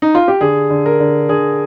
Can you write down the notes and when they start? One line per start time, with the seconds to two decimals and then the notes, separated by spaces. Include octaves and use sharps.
0.02 D#4
0.15 F4
0.28 G4
0.41 D3 G#4
0.70 D3
0.86 A#4
1.00 D3
1.29 D3 G#4